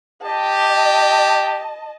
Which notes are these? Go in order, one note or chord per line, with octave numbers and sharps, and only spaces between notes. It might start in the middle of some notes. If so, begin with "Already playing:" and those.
G4 D#5 A5